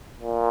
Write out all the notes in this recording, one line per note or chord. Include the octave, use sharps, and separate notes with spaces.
A#2